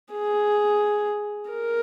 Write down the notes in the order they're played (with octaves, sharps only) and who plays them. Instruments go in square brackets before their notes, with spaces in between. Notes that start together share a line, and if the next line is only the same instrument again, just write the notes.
[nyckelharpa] G#4
A#4